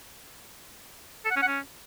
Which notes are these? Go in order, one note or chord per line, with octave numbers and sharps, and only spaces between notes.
A4
F#5
C#4
F#5
C#4